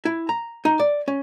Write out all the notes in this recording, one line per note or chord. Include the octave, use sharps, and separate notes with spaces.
E4
A#5
D#4
D5
C#4